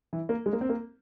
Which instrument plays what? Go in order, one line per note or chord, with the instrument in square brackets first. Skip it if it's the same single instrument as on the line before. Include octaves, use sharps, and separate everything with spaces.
[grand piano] E3
A#3
G#3
A#3
C4
A#3